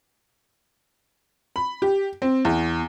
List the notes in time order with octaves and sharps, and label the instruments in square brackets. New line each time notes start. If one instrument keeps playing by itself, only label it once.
[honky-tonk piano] B5
G4
C4
E2